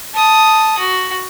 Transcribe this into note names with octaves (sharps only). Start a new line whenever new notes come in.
A5 D#6
F#4